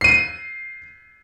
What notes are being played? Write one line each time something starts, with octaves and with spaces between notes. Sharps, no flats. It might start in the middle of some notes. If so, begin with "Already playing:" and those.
C7 D#7